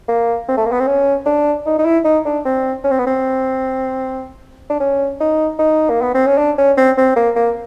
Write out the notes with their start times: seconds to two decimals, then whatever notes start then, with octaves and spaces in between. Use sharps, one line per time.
0.08 A#3
0.48 C4
0.57 A3
0.65 A#3
0.72 B3
0.80 C4
0.87 C#4
1.26 D4
1.66 D#4
1.79 D#4
1.85 E4
2.05 D#4
2.25 D4
2.45 C4
2.84 C#4
2.91 C4
2.99 B3
3.06 C4
4.70 D4
4.80 C#4
5.20 D#4
5.59 D#4
5.90 A#3
6.02 B3
6.14 C4
6.27 C#4
6.38 D4
6.58 C#4
6.77 C4
6.97 C4
7.16 A#3
7.36 A#3